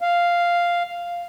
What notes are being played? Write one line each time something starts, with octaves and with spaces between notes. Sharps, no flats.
F5